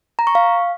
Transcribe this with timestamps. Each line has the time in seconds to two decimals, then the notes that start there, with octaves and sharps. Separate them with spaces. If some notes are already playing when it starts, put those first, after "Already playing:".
0.19 A#5
0.27 C#6
0.35 F5